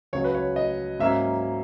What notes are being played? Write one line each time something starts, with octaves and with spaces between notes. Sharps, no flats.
C#2 C#3 F#3 C#5
B4
C#5
D#5
G#2 F#3 A#3 C#4 E5